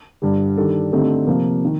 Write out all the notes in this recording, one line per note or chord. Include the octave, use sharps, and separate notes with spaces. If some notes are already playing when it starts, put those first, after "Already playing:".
G2 D3 G3
D#3 G3 D4 A4
D3 A3 C4 D#4 G4
C3 F3 A#3
D#3